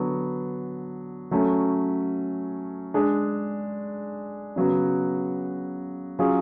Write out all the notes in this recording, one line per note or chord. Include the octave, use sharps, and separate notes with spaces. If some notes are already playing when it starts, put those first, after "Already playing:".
Already playing: D3 F#3 B3
F#3 A3 C#4
G#3 D4 G#4
C#3 F#3 B3 F#4
F#3 C#4 F4 G#4